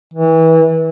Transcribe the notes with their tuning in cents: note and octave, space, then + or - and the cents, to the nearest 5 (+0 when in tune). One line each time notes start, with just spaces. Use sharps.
E3 -25